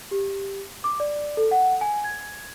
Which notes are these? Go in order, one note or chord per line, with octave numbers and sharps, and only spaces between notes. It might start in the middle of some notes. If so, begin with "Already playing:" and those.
G4
D6
D5
A4
F#5
G#5
G#6